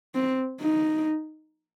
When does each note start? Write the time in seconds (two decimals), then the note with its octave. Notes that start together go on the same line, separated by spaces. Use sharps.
0.15 C4
0.61 D#4